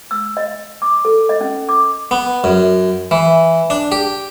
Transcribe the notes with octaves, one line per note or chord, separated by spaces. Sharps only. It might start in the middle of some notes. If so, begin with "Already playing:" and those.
E6
D#5
D6
A4
D#5
C#4
D6
B3
F#2
E3
D4
G4